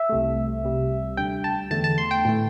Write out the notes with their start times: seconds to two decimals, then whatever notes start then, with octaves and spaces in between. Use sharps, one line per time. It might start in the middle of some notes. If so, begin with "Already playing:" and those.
Already playing: E5
0.09 C2 C3 A3
0.63 C2 C3 G3
1.17 D2 D3 G3 G5
1.44 A5
1.71 E2 D3 A3 A5
1.84 A5
1.98 C6
2.11 G5
2.25 A2 E3 A3